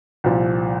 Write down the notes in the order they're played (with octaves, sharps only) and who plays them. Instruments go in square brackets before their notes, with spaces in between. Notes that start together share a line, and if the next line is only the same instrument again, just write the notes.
[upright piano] C2 A#2 F3